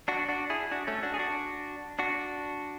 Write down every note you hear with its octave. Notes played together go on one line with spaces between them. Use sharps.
D4 F#4
D4 F#4
E4 G#4
D4 F#4
A3 C#4
D4 F#4
G#4
D4 F#4
D4 F#4